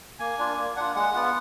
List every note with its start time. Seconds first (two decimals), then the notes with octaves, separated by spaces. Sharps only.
0.19 A#3 G#5
0.38 D4 F4
0.57 A#3
0.76 D4 F4 F#5
0.95 G#3 F#5
1.14 B3 F4 F#5